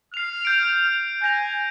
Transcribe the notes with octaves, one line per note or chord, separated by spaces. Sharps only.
F6 C7 F7
G6 D7
G#5 G6 A#6 F7